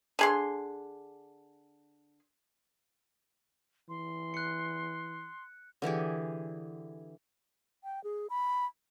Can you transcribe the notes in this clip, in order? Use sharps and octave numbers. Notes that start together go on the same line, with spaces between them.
D3 G#4 C6
E3 C6
F#6 C#7
D3 E3 G4 G#4
G5
G#4
B5